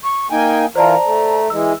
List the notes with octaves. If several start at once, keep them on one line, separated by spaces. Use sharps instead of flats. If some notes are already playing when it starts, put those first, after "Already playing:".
C#6
A#3 D#4 G5 G#5
E3 F4 A#4 C5 D5 A5 A#5
A3
E3 G#3 E6